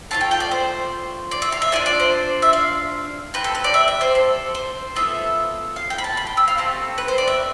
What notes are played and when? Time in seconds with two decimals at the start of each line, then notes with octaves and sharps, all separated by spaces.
0.11 A3 D4 F4 A5
0.21 G5
0.31 G5
0.40 D5
0.51 C5
1.31 D5
1.42 E5
1.52 F5
1.62 E5
1.72 D4 F4 A4 D5
1.86 D5
2.00 C5
2.42 E5
2.53 F5
3.34 C4 G4 B4
3.44 A4
3.55 B4
3.64 D5
3.74 E5
3.88 E5
4.01 C5
4.15 A4
4.55 C5
4.96 B3 F4 A4 E5
5.76 F5
5.90 G5
5.98 B5
6.04 A5
6.17 B5
6.27 G5
6.37 E6
6.48 F5
6.58 A3 C4 G4 A4
6.98 B4
7.08 C5
7.18 D5
7.28 E5